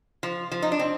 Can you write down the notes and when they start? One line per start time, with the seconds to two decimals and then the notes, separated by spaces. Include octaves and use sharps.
0.23 F3
0.52 F3
0.62 D#4
0.72 D4
0.79 C4